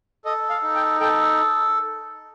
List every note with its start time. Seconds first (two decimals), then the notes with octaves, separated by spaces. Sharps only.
0.25 A4 D#5
0.50 F5
0.63 D#4
0.75 G5
1.00 A4 G5